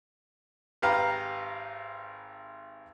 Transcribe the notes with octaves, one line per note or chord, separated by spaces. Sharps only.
G#1 G4 B4 F5 A#5